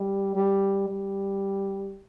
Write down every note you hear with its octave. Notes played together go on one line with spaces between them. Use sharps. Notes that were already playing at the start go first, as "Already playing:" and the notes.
Already playing: G3
G3
G3